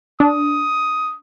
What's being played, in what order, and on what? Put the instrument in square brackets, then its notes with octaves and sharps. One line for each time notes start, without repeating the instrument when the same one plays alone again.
[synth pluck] D4 [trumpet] D#6